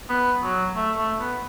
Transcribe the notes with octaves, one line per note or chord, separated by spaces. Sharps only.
B3
F#3
A3
A3
B3